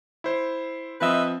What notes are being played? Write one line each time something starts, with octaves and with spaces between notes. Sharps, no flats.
E4 C5
F3 C4 B4 D#5 E5